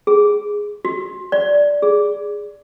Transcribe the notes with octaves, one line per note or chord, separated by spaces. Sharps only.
G#4
F#4
D5
G#4